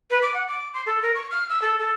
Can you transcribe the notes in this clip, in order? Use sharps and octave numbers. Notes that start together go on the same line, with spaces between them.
B4
D6
F#5
D6
C6
A4
A#4
C#6
F6
E6
A4
A4